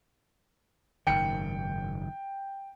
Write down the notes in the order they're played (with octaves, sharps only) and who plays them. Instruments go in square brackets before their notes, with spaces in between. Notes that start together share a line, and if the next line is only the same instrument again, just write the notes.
[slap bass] F#1 G#2 D#3 [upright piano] G5 C#7